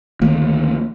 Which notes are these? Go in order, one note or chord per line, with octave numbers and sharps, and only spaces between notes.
D2 D#3 F3 A#3